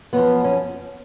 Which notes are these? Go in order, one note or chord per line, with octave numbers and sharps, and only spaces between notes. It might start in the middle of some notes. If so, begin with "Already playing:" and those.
F#2 F3 B3
C#4